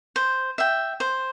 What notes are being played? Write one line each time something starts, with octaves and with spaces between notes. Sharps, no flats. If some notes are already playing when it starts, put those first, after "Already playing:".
C5
E5 G5
C5